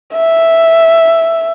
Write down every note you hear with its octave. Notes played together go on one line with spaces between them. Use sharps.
E5